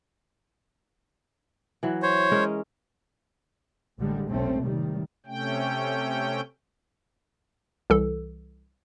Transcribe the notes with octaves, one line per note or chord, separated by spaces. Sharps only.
E3 F#3
C5 C#5
G#3 C#4 A#4
A1 D3 G3 G#3
F1 B1 A3 C4 C#4
A2 C3 D#3 G3
C3 A3 C#4 G5
C2 E3 A4